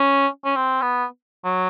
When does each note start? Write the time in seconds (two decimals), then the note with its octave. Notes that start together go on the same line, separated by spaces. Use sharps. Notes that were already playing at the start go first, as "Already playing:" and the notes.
Already playing: C#4
0.45 C#4
0.56 C4
0.82 B3
1.45 F#3